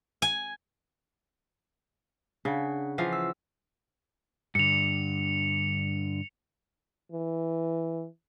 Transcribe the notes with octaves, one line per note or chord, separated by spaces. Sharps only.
G#5
C#3 D4 F#5
E3 F3 F5 F#5
E6
G2 D3 C#7 F7
E3